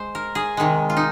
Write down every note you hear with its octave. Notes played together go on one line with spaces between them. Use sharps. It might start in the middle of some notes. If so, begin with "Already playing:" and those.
Already playing: G#3 C5
A#4
G#4
C3 D#3 G#3
F4
D#4